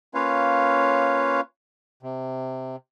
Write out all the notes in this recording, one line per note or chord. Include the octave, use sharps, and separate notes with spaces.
A#3 C#4 F4 B4 C#5 F5
C3